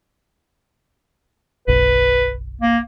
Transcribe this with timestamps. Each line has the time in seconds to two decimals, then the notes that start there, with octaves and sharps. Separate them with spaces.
1.68 F#1 B1 B4
2.61 A#3